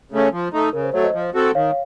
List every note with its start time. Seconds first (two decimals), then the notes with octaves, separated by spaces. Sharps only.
0.12 C#3 A3 C#4
0.32 F3
0.53 A3 D#4
0.73 C#3 A#4
0.83 C5
0.94 F#3 A3 C#5
1.04 C5 D#5
1.14 F3
1.35 C4 F#4 A4
1.55 D#3 C#5 F5